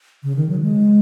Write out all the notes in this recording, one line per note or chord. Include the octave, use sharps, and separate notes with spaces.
C#3
D#3
F#3
G#3